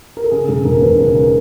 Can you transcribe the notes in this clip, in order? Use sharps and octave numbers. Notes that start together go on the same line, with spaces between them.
A#4
A4
C#3 G#4
E1 A4
E1 A#4
D#2 B4
C#3 B4
A#4